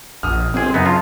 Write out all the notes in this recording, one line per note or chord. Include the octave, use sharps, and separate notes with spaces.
A#1 D#6 F6
G1 C4 G#4
F#2 C#3 B3 D#4
F4 A5